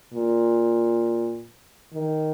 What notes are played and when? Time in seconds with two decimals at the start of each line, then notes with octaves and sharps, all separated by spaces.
0.14 A#2
1.93 D#3